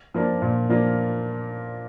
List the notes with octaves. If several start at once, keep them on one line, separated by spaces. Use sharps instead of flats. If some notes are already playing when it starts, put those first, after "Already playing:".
F3 A#3 D4 F4
A#2
F3 A#3 D4 F4